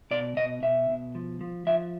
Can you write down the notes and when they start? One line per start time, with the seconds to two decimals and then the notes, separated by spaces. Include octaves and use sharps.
0.11 B2 D5
0.37 B2 D#5
0.62 B2 E5
0.89 B2
1.15 F3
1.41 F3
1.67 F3 E5